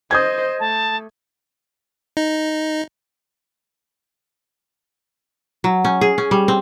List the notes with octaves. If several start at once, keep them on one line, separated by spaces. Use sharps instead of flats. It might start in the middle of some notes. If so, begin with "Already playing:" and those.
C5 D#5 D#6 G6 G#6
A3 A5
D#4
F#3
C#4
G#4
C#4
G3
C4